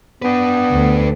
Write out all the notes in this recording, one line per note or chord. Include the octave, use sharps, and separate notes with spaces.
B3 D4 B4
D2